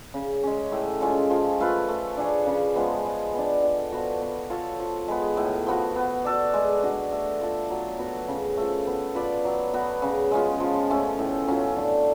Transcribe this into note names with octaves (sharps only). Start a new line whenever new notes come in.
C#3
G#3 C#4
A2
G#3 C#4 F4
F3
A3 F4 B4
A3
D4 G#4 C#5
C#3
F3 G#3 B3
G#3
B3 D4
D3
F3 B3 F#4
B3
F4 A4 C#5
F3
G#3 B3
A2
F3 B3 F#4
B3
F#4 A4 D5
G#3
D4 F#4
A3
F4 A4
F#3
B3 F#4
C#3
F3 A3
B3
F4 B4 D5
F#3
B3 F#4
C#3
G#3 C#4 F4
F3
A3 C#4 F4
A2
F#3 C#4 F4
D3